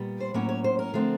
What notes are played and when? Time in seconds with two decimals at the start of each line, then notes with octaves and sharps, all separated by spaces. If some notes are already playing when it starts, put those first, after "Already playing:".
Already playing: A#2 G3 B3
0.20 C5
0.34 A2 F#3 A#3 C#4 C#5
0.49 C#5
0.64 C5
0.79 A#4
0.94 D3 F3 A3 C4